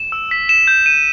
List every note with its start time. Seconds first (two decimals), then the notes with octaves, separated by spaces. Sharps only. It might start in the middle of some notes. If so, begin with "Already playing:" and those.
Already playing: E7
0.12 E6
0.31 B6
0.49 E7
0.67 G6
0.86 D#7